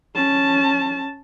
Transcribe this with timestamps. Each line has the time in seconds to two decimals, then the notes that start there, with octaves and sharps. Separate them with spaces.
0.15 C#4 A5